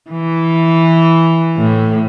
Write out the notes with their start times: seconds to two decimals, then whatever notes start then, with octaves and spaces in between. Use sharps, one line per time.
0.11 E3
1.57 A2